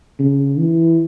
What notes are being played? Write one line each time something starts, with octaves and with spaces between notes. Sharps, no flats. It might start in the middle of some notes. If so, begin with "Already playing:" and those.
C#3
E3